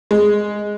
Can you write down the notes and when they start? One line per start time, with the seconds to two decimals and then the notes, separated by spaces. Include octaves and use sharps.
0.11 G#3